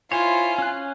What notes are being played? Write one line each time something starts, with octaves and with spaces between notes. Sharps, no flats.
E4 F4 C5 C#5 G#5
C#4 F#6